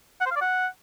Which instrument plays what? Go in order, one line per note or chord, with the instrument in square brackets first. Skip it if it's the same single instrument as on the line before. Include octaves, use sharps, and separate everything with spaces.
[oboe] F#5
C5
F5
D5
F#5